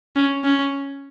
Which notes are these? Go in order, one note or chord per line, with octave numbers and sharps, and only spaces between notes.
C#4
C#4